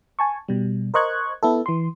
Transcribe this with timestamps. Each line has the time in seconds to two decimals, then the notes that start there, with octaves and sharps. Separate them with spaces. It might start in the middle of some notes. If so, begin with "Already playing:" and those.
0.19 G#5 A5 C#6
0.48 B2 G3
0.94 A#4 C5 D#5 C#6 F#6 G#6
1.43 B3 E4 A4
1.66 E3 C6